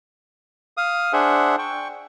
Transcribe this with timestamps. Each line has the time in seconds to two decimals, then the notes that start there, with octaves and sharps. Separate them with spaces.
0.77 F5 D#6
1.13 D4 G#4 C5 E5 F#5
1.58 G5 C#6